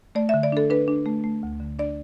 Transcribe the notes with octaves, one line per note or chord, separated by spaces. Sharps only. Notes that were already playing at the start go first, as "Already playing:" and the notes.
A3 D5
E5
D3
D5
D4 A4
D4 B4
D4
A3
A3
D2
D3
D4 D5